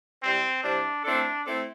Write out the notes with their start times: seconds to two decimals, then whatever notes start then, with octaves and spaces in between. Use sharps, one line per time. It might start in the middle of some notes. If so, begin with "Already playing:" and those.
0.23 C3 G3 C4 E4 C5
0.64 C3 G3 D4 E4 C5
1.05 A3 C4 D4 E4 A4
1.46 A3 C4 E4 A4